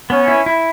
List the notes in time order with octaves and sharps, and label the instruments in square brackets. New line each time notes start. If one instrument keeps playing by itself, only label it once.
[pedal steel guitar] B3 [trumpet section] C#4
[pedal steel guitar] E4
E4